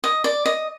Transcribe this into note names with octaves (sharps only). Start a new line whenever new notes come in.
D#5
D5
D#5